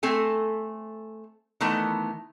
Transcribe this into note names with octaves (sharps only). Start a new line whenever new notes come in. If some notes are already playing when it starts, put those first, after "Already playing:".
A3 C4 A4 G#5
D#3 E3 A3 B3